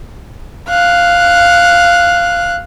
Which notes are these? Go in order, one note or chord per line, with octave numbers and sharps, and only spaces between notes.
F5 F#6